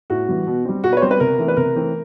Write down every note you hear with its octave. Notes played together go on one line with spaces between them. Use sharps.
A2 F#4
E3 G3
B2
G3 C4
B2 F#4
B4
C#5
G3 C4 C5
B4
C3 A#4
E3 A3 C4
B4
C3 A#4
E3 A3 C4